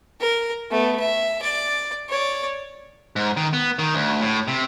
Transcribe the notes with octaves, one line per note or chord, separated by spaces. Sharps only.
A#4
A3 B3
E5
D5
C#5 D5
G#2
D#3
B3
D#3
D2
A2
C3